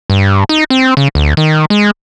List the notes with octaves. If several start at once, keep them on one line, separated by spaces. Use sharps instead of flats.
G2
D#4
C4
C#3
D2
D#3
G#3